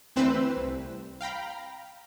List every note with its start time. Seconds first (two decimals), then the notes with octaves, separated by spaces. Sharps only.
0.16 D2 E3 C4 B4 C5 E6
0.57 C2
1.21 F5 G5 A#5 B5